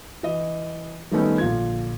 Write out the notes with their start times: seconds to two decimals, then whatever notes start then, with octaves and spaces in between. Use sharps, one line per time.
0.23 E3 D#5
1.11 D#3 G3 A3 B3 C#4 D#4
1.38 A#1 D3 F4 G#6